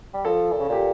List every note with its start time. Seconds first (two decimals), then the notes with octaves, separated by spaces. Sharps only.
0.14 G3
0.25 F3 A4
0.52 A#2
0.60 C#3
0.69 A#2 G4